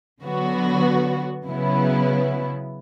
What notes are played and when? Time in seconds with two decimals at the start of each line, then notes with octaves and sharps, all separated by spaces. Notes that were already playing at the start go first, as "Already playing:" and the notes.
0.22 D3 F#3 B3 F#4
1.47 C#3 F#3 B3 E4